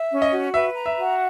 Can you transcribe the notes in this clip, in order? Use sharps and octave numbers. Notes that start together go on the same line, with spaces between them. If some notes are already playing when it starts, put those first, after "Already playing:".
Already playing: E5
C#4
D#5
F#4
B4 E5
A#5
E5
F#4